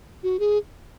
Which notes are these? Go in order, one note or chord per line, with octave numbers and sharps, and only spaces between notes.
F#4
G#4